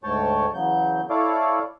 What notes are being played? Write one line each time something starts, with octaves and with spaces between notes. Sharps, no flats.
D2 G#2 C#5 G5 A5
E2 C#3 F#3 G6
E4 A4 C#5 D5 F5 D6